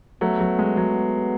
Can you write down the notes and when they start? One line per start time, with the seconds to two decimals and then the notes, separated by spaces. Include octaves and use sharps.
0.21 F#3 A3 B3
0.40 F#3
0.59 G#3
0.77 F#3